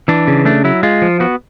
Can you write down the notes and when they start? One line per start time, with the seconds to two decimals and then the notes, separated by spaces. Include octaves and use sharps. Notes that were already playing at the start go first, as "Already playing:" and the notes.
0.08 E3 D4
0.28 C#3
0.45 A3 D4
0.64 F#3 E4
0.83 G#3 F4
1.02 F3
1.20 B3 F#4